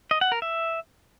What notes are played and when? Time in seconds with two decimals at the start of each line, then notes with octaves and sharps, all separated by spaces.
0.11 D#5
0.21 F#5
0.32 A#4
0.42 E5